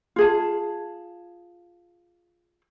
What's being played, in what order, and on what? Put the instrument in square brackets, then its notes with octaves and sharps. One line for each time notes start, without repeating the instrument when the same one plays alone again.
[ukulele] F4 G#4 A5